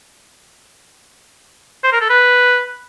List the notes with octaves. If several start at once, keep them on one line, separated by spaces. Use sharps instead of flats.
C5
A#4
A4
B4